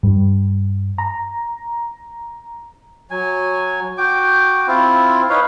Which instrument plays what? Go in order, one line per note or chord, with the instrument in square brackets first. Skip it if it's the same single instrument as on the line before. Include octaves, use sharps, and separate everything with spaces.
[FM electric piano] G2
A#5
[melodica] F#3 G#5
F#4 G5 D6
C4 E4 F4
D#4 B4 C#5 F5